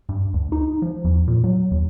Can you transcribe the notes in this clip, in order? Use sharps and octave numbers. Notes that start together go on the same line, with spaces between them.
G2
D2
D#4
F3
E2
A#2
F#3
D#2